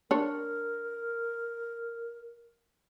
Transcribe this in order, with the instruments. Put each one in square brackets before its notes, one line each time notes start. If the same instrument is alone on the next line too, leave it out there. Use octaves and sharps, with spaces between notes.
[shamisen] D4 C#5 [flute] A#4